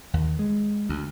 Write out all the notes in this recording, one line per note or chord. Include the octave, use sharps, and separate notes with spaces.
D#2
G#3
D2